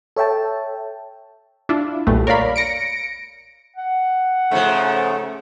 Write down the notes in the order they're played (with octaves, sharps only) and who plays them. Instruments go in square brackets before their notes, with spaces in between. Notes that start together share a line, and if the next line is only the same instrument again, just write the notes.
[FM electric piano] A4 C#5 E5 G5 A5
[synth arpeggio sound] D4 E4 F4
B1 E2 A#2 G3 A3
A#4 C#5 D5 F5 B5
A#6 C#7 D7
[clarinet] F#5
[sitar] G#2 F3 [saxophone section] C#3 A3 C#4